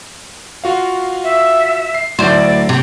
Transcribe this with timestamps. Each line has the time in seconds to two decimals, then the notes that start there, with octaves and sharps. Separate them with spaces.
0.64 F4 F#4 F5
1.24 E5
1.94 C7
2.19 D2 F#3 E4 C5 D5
2.69 C3